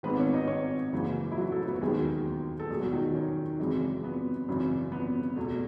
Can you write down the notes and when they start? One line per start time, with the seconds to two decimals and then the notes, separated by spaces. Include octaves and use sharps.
0.03 G#1 G#2 D#3 B3 B4
0.18 C#4 C#5
0.33 D#4 D#5
0.47 C#4 C#5
0.92 F#1 F#2 C#3 E3 G#3
1.32 E4
1.37 F#3 F#4
1.52 A3 A4
1.66 B3 B4
1.74 F#4
1.81 E1 D#2 D#3 F#3 G#3 G#4
2.59 A4
2.70 E2 B2 F#3 G#3 A3 G#4
2.81 F#3 F#4
2.92 D#3 D#4
3.15 C#4
3.59 G#1 F#2 C#3 E3 G#3
4.04 B3
4.48 G#1 F#2 C#3 E3
4.92 B3
5.36 E2 B2 A3